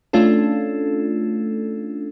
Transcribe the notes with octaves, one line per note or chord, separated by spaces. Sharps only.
A3 C#4 D4 F4 A4